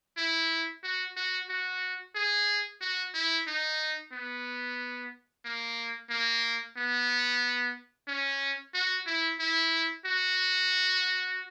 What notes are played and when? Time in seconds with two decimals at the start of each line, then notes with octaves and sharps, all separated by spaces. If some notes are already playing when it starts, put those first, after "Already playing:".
0.17 E4
0.83 F#4
1.17 F#4
1.49 F#4
2.15 G#4
2.81 F#4
3.14 E4
3.47 D#4
4.12 B3
5.45 A#3
6.10 A#3
6.77 B3
8.08 C#4
8.74 F#4
9.07 E4
9.40 E4
10.06 F#4